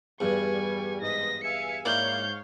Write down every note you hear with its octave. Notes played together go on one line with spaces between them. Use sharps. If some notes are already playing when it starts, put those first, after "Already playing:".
E2 G2 G3 G#5 C#6
G#2 D#5 A#6 B6
E5 F5 G#5 C#7
G#2 A#3 E4 C#5 D5 F5 G6